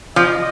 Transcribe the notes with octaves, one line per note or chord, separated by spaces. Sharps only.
F3 D#5